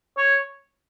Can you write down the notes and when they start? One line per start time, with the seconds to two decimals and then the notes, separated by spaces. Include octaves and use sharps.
0.17 C#5